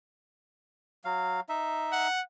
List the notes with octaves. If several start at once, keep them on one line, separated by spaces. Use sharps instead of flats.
F#3 F5
D#4 E5
F#5